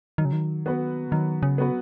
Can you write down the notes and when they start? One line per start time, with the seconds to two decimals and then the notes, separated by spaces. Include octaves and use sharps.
0.18 D#3 F#3
0.25 C#3
0.33 D#3
0.66 B3 F#4 B4
1.08 C#3
1.11 D#3 F#3
1.43 C#3
1.58 B3 F#4 B4